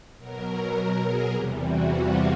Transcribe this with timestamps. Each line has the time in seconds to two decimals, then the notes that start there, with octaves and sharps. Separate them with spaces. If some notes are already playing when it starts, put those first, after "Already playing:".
0.18 B2 F#3 A#4
1.04 G#4
1.32 E2 C3 E3 G3 G4
1.61 F#4
1.89 F4